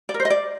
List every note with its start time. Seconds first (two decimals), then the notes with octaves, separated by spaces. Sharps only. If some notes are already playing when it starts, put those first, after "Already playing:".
0.09 D5
0.14 A#4
0.20 C5
0.25 D#5
0.30 D5